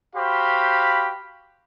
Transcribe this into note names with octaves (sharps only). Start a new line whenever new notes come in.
F#4 G4 C5 F5 B5